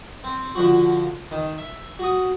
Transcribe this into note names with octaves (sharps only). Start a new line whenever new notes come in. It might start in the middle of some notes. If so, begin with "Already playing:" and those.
C4
D3 F3 F#4
D#3
E5
F#4 D#6